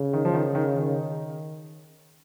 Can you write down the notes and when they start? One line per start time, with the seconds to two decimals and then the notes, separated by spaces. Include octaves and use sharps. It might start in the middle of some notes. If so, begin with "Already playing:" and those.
Already playing: C#3
0.13 D#3
0.25 F3
0.34 D#3
0.55 D#3
0.76 D#3